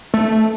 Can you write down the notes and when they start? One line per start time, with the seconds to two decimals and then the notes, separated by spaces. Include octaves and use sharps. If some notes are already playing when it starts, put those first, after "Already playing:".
0.14 A3